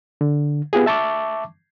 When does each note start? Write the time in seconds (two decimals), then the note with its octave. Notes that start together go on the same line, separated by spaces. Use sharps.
0.21 D3
0.73 B3 F4 G4 G#4
0.86 E5 A5 C#6 D6